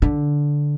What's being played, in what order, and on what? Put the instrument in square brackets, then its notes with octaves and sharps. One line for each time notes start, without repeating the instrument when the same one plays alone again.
[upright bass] D3